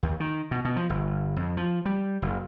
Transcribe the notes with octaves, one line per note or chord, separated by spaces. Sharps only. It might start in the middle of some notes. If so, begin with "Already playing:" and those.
D#2
D#3
B2
B2
F3
G1
F2
F3
G3
F#1